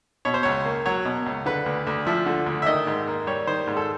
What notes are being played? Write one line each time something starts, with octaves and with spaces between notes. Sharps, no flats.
B2 C#5
C5
C#2 C#5
A#3
F#3 C#5
B2
C#2
D3 B4
D2
D2
F3 E5
D3
D2
E5
D#3 D#5
G#2
A#3
G3 C#5
D#3 C5
G#2
A4